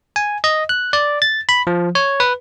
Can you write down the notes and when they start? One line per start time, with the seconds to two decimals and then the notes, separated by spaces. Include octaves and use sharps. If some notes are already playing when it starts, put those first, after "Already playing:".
0.16 G#5
0.44 D#5
0.69 F#6
0.93 D5
1.22 A6
1.49 B5
1.67 F3
1.95 C#5
2.20 B4